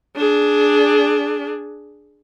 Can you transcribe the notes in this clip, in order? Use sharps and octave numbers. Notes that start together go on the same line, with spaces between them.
D4 G#4